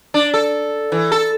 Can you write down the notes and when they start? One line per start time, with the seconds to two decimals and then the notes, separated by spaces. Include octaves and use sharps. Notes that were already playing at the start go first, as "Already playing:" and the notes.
0.14 D4
0.34 A4
0.92 E3
1.12 A4